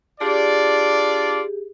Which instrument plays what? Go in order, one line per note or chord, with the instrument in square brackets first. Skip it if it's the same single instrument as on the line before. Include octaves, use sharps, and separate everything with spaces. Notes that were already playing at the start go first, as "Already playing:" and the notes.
[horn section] D4 F4 D5 [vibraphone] G4 G#4